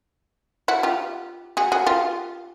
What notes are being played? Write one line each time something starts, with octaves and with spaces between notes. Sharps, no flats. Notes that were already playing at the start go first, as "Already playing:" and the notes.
E4 F#4
F4 G4
F#4 G#4
F#4 G#4
F4 G4